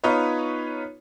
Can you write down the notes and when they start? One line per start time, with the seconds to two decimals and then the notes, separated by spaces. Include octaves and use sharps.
0.04 B3 D#4 F4 B4 C#5